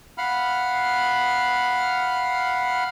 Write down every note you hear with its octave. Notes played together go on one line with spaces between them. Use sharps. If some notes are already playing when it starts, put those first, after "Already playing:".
F5 F#5 B5 F6